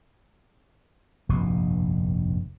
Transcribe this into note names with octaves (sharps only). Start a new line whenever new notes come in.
F1 A#1 G2 B2